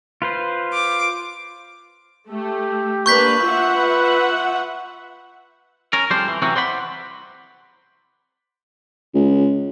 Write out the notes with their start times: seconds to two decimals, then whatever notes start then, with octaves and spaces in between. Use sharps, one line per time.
0.22 F4 B4 C5
0.73 D6
2.29 A3 G4
3.06 A#3 D4 B4 C#6 G6 B6
3.43 F4 E5 F#5
3.77 B4
5.93 C#4 A#4
6.11 F2 G3 C#4 D4 C5
6.28 E3
6.42 C3 E3 F#3 C4 C#4 F#4
6.56 C5 D5 F#5 B5
9.14 C#2